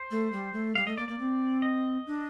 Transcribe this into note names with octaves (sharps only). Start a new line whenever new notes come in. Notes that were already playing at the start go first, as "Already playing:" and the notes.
Already playing: C5
A3
G3
A3
G3 F5
A3 D#5
A#3 D5
A#3 D5
C4
D#5
D4